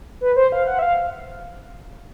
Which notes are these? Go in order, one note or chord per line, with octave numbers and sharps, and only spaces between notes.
B4
C5
F5
F#5
E5
F5